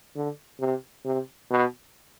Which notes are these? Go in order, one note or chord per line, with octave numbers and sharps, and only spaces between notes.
D3
C3
C3
B2